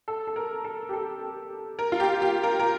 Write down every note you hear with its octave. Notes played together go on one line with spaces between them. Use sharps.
A4
A4
A#4
A4
G4
A4
A#4
F4
G4
G4
A#4
A#4